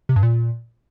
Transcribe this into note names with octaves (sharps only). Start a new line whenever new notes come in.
C3
G2
A#2